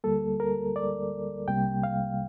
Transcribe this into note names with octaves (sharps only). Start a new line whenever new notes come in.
D2 D3 G3 A#3 A4
A#4
D5
C2 C3 G3 A#3 G5
F5